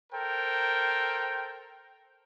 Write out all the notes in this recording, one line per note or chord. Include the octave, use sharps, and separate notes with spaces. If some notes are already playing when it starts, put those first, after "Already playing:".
A4 A#4 C5 G5